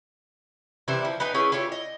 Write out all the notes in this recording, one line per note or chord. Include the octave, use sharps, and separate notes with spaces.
C3 E3 G3 E4
F3
B3 D#4 B4 G#5
C#4 E4 G#4 B4
E4 F4 G4 C#5
D#5